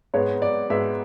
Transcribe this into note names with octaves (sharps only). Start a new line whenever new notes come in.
G#2 G#3 B3 C#5
D5
G#2 G#3 B3 E5